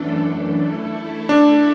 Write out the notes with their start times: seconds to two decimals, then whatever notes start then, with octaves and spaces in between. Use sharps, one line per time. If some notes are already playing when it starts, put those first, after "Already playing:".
Already playing: F#2 E3 A3 D4 A4
0.57 A3 E4 A4
1.29 D4